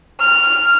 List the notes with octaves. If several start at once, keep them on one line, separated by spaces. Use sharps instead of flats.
F6